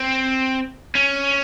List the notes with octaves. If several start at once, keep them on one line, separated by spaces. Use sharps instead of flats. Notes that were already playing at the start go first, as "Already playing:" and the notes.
Already playing: C4
C#4